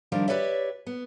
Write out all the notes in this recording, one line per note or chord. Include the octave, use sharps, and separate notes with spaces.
D#3 F3 G3 D4 A#4
G4 G#4 B4 C#5 D5 E5
B3